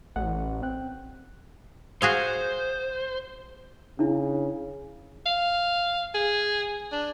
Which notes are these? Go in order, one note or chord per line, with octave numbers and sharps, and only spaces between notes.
A1 F#5
C4 G5 F#6
F#4 G#4 C5 F5
C#3 D4 E4
F5
G#4
D4